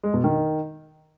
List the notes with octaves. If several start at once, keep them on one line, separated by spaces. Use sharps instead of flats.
G#3
B2
D#3